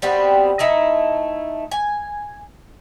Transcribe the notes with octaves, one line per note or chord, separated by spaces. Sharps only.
G3 B3 C4 F#4
A3 D#4 E4
G#5